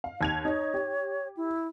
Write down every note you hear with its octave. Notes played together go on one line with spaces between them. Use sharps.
F5
D#2 G#6 F7
D#4 C#5
G4
E4